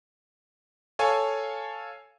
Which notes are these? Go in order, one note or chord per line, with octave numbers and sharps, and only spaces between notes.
A4 C#5 F5 G#5